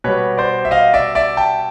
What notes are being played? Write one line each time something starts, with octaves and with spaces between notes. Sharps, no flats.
B2 G3 B4 C#5
C5 D5
E5
D#5 F5
D5 E5
D5 E5
G5 A5